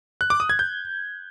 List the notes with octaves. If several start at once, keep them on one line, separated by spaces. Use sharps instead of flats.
F#6
D6
D#6
G#6
G6